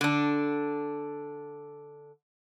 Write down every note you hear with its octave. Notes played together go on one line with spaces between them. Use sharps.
D3 D4